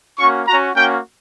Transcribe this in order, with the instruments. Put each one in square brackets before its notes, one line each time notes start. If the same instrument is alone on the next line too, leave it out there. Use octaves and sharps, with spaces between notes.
[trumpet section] A#3 C#4 F#4 C#6
C#4 F#4 A#5
A#3 C#4 F#4 G5